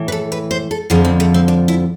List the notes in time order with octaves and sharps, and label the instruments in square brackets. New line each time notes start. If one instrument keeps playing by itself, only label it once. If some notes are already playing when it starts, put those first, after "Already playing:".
Already playing: [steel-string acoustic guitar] A2 E3
B4
A4
B4
C5
A4
F2 D3 F3 G#4
C4
A3
C4
D4
E4